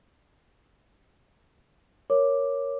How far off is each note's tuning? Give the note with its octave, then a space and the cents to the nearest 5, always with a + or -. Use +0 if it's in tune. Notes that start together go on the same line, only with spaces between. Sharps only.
A#4 +0 C#5 +0 D6 +0